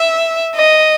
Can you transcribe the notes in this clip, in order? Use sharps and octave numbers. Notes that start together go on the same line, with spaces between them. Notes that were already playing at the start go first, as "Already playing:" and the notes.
Already playing: E5
D#5